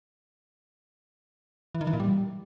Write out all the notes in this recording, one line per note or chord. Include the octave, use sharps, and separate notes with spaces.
E3
D#3
E3
A#2
G3